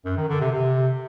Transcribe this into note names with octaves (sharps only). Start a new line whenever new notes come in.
F#2
D#3
D3
C3
C3